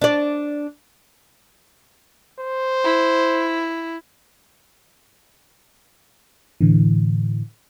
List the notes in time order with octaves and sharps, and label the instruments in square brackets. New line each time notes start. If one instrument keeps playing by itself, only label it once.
[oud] D4 D5
[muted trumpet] C5
[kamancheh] E4
[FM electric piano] A2 D3 E3